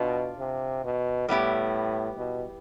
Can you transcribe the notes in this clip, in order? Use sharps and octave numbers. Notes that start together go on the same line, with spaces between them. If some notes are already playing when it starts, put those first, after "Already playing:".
Already playing: B2 D4 F4
C3
B2
A2 G3 B3 E4 G4
B2